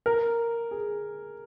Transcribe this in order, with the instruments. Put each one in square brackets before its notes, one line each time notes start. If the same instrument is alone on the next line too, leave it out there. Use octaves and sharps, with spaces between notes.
[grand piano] A#4
G#4